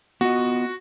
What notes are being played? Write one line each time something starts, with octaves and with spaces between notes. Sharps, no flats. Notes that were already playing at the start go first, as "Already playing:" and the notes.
B3 F4 F#4 D#5